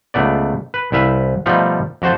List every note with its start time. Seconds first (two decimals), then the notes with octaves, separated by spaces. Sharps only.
0.14 C#2 A3 B3 D5
0.74 B4
0.92 C2 E4 B4 E5 F5
1.46 B2 F3 G3 A3 D#4 F4
2.02 F2 F#4 C5 A5